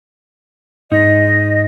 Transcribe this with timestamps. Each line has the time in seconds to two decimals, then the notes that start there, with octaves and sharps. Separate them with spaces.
0.91 G#2 D#4 D#5